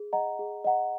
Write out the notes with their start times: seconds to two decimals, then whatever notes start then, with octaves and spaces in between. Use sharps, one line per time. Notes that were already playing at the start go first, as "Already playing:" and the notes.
Already playing: G#4
0.13 D#5 F#5 A#5
0.39 G#4
0.65 D#5 F#5 A#5